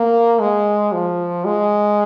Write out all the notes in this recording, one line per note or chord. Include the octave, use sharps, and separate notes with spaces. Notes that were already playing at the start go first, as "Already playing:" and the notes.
Already playing: A#3
G#3
F3
G#3